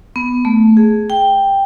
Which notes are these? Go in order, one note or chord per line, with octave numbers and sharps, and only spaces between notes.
B3
A3
G#4
G5